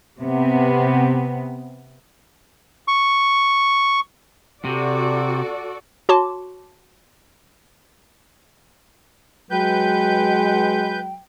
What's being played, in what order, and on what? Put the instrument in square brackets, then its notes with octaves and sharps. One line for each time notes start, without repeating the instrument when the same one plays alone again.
[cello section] C3 B3
[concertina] C#6
[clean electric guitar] C3 [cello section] F#4 A4 D5
[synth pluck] F#4 C#5 A5 C6 D6
[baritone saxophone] F#3 [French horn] G#3 [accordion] B4 G6 [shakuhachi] G5